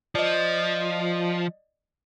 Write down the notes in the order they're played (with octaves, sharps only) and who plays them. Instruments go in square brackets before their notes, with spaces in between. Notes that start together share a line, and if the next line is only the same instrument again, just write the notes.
[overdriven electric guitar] F3 [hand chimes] D5 D#5